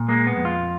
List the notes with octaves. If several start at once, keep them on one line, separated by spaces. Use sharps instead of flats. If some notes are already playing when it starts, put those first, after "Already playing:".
Already playing: A#2
G#3 A#3
B3
F2
F4